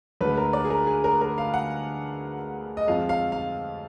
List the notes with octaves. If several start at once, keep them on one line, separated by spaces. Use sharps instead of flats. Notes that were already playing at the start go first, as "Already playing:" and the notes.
D2 D3 G#3 B4
A#4
D5
G#4
A#4
G#4
A#4
A#4
F5
F#5
D#5
F2 F3 G#3 F5
F5
F5